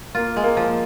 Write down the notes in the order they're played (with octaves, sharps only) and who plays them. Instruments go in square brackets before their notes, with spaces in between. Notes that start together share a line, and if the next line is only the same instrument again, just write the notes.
[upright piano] A#3 [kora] F4
[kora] G#3
[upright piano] A#3
[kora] F3